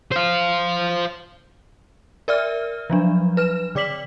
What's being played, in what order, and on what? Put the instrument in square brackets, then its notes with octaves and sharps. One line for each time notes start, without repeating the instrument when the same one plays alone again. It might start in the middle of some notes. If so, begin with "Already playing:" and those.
[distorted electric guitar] C5 F5
[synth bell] A#4 D5 E5 F6
F3 F#3 D4
B4 F6 E7
D3 D5 D6 B6 F#7